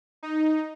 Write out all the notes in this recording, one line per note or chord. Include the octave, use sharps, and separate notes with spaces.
D#4